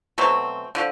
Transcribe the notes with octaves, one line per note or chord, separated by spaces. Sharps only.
B2 F#3 A3 C4
D3 F3